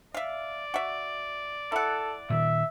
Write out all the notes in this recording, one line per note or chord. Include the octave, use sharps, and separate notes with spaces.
D5 E5 F5
F#4 E5
E4 A4 F#5
A#2 D#3 E5